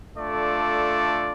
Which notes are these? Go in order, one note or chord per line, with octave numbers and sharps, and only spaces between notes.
A3 D4 F4 A4 D5